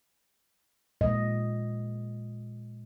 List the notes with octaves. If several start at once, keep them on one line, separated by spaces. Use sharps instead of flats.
A#2 G#3 D#5